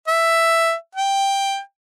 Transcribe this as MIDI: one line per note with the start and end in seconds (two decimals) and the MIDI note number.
0.07 0.73 76
0.95 1.60 79